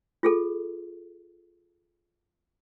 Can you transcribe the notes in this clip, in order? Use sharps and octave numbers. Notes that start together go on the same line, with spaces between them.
F4 G#4 A4